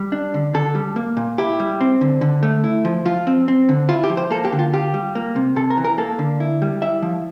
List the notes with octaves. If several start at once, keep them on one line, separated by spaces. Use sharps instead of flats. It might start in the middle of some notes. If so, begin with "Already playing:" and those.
Already playing: G3
D4
D3
D3 A4
G3
A#3
A#2
E4 G4
G3
C4
D3
D3
A3
E4
F3
F3 F4
C4
C4
D3
E4 F4
G4
F3
C5
A#3 A4
G4
D3
F4
F4 G4
G3
A#3
C3
C3 A4
A#4
E3
A#4
A#3 A4
D3
E4
G3
E4 E5
F3